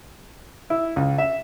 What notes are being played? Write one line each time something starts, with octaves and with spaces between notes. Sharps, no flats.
E4
C#2
E5